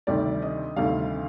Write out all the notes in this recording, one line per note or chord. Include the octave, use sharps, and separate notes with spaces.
D2 C3 D#3 G3 D5
D#5
D2 C3 D#3 G3 F5